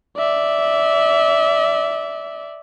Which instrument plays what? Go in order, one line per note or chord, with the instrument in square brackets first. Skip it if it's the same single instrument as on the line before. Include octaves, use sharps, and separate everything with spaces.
[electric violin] D5 E5